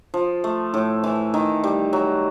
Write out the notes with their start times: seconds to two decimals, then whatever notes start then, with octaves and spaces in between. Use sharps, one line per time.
0.14 F3
0.44 A3
0.74 A2
1.04 E3
1.34 D#3
1.64 G3
1.93 F#3